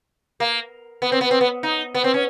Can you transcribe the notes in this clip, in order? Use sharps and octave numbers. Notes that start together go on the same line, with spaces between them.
A#3
B3
C4
B3
C4
B3
D#4
B3
C4
C#4